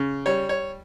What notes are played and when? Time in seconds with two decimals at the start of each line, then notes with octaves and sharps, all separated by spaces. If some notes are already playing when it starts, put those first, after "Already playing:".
Already playing: C#3
0.26 G3 C#5
0.49 C#5